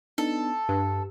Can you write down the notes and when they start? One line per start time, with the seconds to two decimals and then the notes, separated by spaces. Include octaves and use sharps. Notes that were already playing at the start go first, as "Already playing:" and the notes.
0.18 B3 D4 D#4 A4
0.69 G2 G4